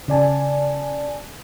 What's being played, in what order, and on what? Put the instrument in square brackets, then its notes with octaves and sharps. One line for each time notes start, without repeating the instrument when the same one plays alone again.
[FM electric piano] C#3 D5 G#5 A5